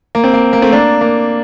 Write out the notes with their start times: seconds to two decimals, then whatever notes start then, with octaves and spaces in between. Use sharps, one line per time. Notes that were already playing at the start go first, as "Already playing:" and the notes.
0.15 A#3
0.24 C4
0.34 A#3
0.53 A#3
0.62 A3 C4
0.73 A#3 D4
1.01 A#3